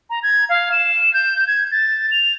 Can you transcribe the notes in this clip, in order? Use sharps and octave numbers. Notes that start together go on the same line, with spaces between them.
A#5
G#6
F5
E7
G6
G#6
A6
F7